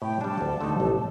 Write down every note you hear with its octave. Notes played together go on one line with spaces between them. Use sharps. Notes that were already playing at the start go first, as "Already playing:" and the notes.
A2 G5
G3 D4 A5
D2
D3 A3 D#4
A1